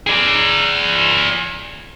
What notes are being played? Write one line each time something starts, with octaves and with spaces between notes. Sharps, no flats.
G#4 D5